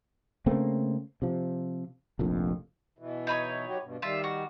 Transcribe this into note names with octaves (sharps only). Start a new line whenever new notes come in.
C#3 A3 A#3 C4
C3 F3
F1 A#1 F2
B2 E3
D#4 B4 C#5
F#3 F#4 G4
G2 B2
D#3 G3 F4 E5
F#4